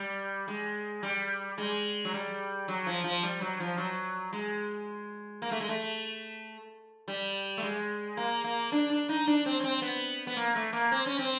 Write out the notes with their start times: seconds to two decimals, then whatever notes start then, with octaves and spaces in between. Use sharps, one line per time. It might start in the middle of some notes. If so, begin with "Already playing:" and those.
Already playing: G3
0.48 G#3
1.03 G3
1.58 G#3
2.05 F#3
2.14 G3
2.68 F#3
2.86 F3
3.04 F3
3.23 G3
3.41 F#3
3.60 F3
3.78 F#3
4.33 G#3
5.42 A#3
5.51 A3
5.60 G#3
5.69 A3
7.08 G3
7.57 A3
7.62 G#3
8.17 A#3
8.44 A#3
8.72 D4
8.90 D4
9.09 D#4
9.27 D4
9.46 C4
9.60 C#4
9.64 C4
9.82 B3
10.27 B3
10.37 A#3
10.56 A3
10.73 A#3
10.92 C4
11.06 C#4
11.19 C4